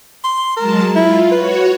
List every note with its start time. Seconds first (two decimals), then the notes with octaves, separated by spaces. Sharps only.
0.24 C6
0.56 F#3 G#3 A#4 A5
0.96 E4 F4
1.32 F#4 B4 C#5